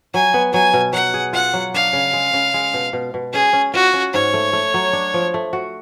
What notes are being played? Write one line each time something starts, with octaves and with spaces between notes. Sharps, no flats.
F#3 G#5
B3
F#3 G#5
B2
F#3 F#5
G#4
F4 F#5
F#3
D4 F5
C#3
G#3
C#3
G#3
B2
B2
B2
C#4 G#4
C#4
F4 F#4
C#4
G#2 C#5
A3
A3
F#3
D4
F3
A3
F#4